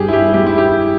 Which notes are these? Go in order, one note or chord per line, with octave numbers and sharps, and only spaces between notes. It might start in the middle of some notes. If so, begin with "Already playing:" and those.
Already playing: G2 G3 G4 G#4
E4
G4
G3 G4
E4
G4